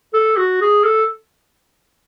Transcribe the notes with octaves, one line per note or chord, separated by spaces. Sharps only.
A4
F#4
G#4
A4